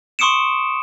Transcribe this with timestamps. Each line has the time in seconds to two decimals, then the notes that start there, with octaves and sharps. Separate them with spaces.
0.19 C6 C#6 D#6 C#7 D7 E7